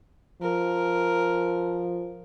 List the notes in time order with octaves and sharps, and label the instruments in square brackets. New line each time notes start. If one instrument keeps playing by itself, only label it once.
[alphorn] F3 [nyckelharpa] A#4